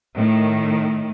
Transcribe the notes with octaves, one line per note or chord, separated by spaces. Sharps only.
A2 D#3